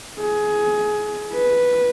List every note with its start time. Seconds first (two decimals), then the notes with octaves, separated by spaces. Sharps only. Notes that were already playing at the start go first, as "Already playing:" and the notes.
0.20 G#4
1.33 B4